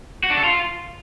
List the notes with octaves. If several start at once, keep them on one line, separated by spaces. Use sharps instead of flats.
F#4
D4
A4
F4